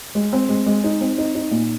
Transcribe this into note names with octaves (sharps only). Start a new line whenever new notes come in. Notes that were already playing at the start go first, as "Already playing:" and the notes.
G#3
C4
G#3
G#3
D#4
C4
D#4
D#4
A#2